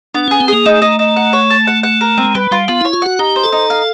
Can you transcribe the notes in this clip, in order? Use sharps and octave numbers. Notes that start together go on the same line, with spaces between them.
B3 D4
C#4 G#4
C4
A#3 G#4
A3 D#4
D#4
D#4
F#5
C#5
A5
F#5
F#5
A#4
G#3 C4
G3 B4
G3 F4
B3 F4
E4 C#5
F4
F#4 F#5
D#4 G4
C5
A4
D#4
F5